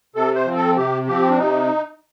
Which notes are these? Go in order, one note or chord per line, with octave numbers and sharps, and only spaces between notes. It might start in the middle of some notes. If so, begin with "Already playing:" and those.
C3 A4
C5
F3 C4
A4
C3 G4
F3 C4 G4
D4
C3 D#4